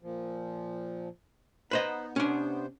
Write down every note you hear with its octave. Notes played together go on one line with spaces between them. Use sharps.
A#2 F3
B3 D#4 B4 C5 D#5
C3 B3 C#4 D4 C5